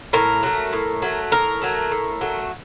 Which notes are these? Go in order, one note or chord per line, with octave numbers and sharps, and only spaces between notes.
A2 A#4
F#3 A3
A2
F#3 A3
A2 A#4
F#3 A3
A2
F#3 A3